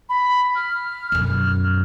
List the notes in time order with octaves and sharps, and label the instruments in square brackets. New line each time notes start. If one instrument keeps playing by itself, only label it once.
[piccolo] B5
F6
[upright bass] F#2 B2